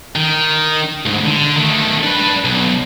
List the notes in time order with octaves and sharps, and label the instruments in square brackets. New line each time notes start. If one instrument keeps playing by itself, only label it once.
[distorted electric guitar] D#3
D2 G#2
D3
D#3 A3
D4 B4
B1